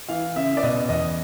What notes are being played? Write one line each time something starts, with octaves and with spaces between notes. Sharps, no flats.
E3 F5
C#3 E5
D5
B2 D#5
E2 D#5